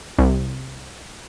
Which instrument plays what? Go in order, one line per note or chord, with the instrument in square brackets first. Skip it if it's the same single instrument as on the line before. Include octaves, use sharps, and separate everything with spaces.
[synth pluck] C2